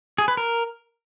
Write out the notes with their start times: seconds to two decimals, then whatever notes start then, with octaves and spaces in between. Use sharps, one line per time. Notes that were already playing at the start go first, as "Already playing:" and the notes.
0.18 G#4
0.28 B4
0.37 A#4